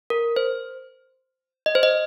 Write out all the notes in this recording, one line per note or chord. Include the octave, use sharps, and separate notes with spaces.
A#4
C5
D#5
C5
D#5